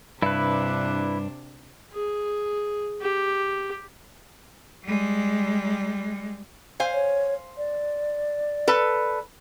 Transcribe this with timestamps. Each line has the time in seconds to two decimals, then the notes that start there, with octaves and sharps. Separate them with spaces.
0.22 G2 C3 D4 E4 B4
1.93 G#4
3.01 G4
4.84 G3 G#3
6.80 C5 F5 G#5
6.93 C#5
7.57 D5
8.68 A4 B4